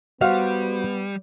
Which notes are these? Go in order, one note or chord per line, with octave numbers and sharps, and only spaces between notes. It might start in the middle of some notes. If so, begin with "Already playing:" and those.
G3 B3 F#4 C5 F5